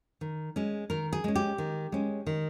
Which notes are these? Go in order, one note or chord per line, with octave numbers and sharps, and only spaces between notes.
D#3
G#3 C#4
D#3 A#4
G#4
G#3 C#4
G4
D#3
G#3 C#4
D#3